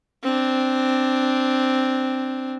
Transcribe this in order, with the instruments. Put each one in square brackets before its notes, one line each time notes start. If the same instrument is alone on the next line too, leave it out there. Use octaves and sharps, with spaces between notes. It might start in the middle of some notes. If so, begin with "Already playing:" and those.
[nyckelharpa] C4 D4